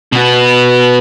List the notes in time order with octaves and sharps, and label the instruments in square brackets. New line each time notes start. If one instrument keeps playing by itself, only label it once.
[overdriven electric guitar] B2 B3